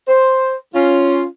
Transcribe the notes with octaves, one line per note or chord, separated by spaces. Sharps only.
C5
C#4 F4